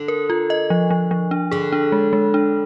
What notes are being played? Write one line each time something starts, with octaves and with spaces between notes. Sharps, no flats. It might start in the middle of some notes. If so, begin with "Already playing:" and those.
Already playing: D3
A#4
F4
D#5
F3
F3
F3
D4
D3 G#4
D4
G#3
G#3
D4